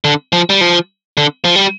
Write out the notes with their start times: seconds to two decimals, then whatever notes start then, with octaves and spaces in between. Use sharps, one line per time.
0.04 D3
0.33 F3
0.50 G3
0.61 F3
1.17 D3
1.45 F3
1.56 G3